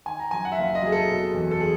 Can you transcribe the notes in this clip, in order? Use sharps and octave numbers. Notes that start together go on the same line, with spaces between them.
D#3 G#5
A#5
F#2 G#5
F#5
E5
F#1 F5
D#5
F#3 G#4
A4
B2
E2
A4
G#4